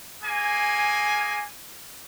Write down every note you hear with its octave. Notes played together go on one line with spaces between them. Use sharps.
A#3 G#4 G#5